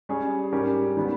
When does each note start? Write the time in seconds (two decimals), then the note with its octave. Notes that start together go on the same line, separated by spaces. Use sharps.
0.09 G3 C#4 G#4
0.52 G#2 G3 C#4 G4 A#4
0.97 D#3 G3 B3